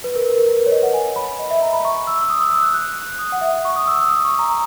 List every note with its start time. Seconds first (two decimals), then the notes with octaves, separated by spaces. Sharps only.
0.04 B4
0.16 A#4
0.26 A#4
0.37 A#4
0.48 A#4
0.60 B4
0.66 C#5
0.72 D#5
0.83 F#5
0.94 G#5
1.16 B5
1.39 D#5
1.50 E5
1.62 A#5
1.73 B5
1.85 C#6
2.07 E6
2.30 D#6
2.40 E6
2.52 E6
2.63 F#6
2.74 F#6
3.19 D#6
3.32 F#5
3.41 E5
3.65 C#6
3.76 D#6
3.87 E6
3.98 E6
4.09 D#6
4.25 C#6
4.39 A#5